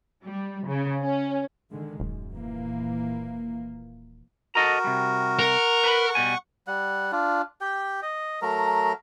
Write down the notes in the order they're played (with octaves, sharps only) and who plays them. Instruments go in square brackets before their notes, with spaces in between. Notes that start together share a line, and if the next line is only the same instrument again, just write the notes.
[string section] G3
C#3
C#4
[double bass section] D3 D#3 G#3
[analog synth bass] D#1 [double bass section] F#2
[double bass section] A#2 E3 A#3
[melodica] F#4 A#4 [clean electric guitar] A4 D#5 A#5
[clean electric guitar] C3 G3
[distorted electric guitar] A#4 [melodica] F#5 C#6
[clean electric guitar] B4 A#5 B5
B2 G3 G#5
[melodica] G3 F#5
D4 F4
G4 G5
D#5
F#3 A3 A#4 A#5